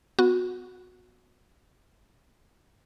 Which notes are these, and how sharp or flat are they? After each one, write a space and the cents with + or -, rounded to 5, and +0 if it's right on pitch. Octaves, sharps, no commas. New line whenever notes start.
B3 +15 F#4 -25